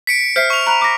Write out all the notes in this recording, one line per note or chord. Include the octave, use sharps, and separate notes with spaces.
B6 C#7 D7
C5 E5 F6 B6 C7
C#6 F7
A#5 B5 F#6
D6 A#6